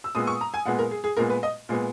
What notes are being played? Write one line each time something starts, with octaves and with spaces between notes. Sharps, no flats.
E6
A#2 G#3 B3 D#6
C#6
A#5
G#5
A#2 G#3 B3 F#5
A#4
G#4
G#4
A#2 G#3 B3 A#4
B4
D#5
A#2 G#3 B3